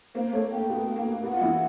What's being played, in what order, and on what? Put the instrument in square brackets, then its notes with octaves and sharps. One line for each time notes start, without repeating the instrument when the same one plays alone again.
[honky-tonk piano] A#3 [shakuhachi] C5
[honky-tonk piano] A3 [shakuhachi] C#5
[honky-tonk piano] A#3 [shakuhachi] G5
[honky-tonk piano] B2 B3
A#3
[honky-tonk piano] B2 B3 [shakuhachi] F#5
[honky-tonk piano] F4
E3 E4